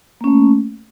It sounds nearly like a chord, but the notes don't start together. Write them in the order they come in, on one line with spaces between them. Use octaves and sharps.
A#3 C#4 A3